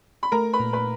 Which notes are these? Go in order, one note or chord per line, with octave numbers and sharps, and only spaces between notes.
B5
A3 A#4 A#5
B4 B5
A#2
B4 B5